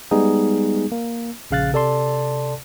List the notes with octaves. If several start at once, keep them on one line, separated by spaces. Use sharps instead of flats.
G3 G#3 B3 D#4 G#4
A#3
A#1 C#3 F5 F#6 A6
C3 A4 D5 A5 C6